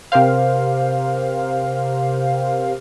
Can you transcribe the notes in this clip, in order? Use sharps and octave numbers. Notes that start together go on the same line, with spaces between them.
C3 G4 A#4 C5 F5